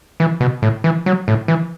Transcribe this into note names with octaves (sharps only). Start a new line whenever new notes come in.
E3
B2
A2
E3
F#3
A2
E3